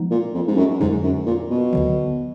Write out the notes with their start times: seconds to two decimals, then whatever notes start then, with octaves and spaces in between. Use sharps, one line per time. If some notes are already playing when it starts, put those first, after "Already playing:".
Already playing: F3 G#3 B3 D#4
0.11 A#2
0.34 F2
0.48 G#2
0.57 F#2
0.80 F2 G#2 D3 F#3
1.03 F#2
1.27 A#2
1.50 B2
1.73 D2 D3 F#3